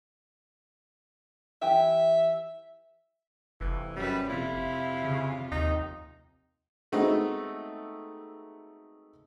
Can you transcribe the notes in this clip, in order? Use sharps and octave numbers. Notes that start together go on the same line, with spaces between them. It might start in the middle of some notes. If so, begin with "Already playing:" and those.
E3 G4 E5 G5
F1 E3
F#2 G3 B4
F2 C3 E4 F4
C#3
D#2 D#4
G#3 A3 B3 C4 D#4 F#4